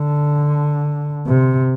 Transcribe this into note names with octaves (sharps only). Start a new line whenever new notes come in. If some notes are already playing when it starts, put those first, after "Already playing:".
Already playing: D3
C3